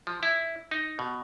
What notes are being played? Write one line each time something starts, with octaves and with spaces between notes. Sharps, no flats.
F3
E4
D#4
B2